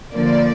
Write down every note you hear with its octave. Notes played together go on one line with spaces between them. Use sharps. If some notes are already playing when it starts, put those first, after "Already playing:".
D3 F3 A#3 D5